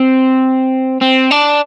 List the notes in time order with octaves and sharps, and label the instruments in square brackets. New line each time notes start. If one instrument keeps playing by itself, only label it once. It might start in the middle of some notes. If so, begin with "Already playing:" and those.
Already playing: [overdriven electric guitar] C4
C4
D4